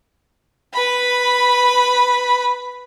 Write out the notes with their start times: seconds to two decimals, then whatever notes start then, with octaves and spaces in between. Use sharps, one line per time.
0.74 B4 B5